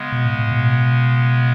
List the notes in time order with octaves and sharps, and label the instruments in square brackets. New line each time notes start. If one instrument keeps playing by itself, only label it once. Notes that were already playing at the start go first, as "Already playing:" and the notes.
Already playing: [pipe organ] C#3 G#3 B3
[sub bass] B2
A2
A2
B2